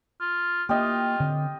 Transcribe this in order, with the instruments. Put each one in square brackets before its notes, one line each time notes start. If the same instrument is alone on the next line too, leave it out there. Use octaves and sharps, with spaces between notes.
[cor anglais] F4
[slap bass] A#3 [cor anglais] F4 [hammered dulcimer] G4 D#5
[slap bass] D3 C4